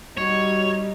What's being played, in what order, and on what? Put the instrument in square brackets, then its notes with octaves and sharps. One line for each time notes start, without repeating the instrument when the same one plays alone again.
[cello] G3 D#4 [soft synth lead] F#4 [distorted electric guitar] C#5